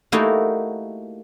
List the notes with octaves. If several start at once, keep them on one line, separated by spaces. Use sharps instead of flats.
A3 A#3 D#4 E4 F#4 G4